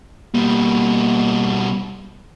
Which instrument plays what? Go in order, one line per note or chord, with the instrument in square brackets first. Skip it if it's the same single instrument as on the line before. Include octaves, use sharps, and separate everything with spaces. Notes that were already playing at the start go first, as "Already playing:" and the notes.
[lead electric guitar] B2 G3 [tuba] A#3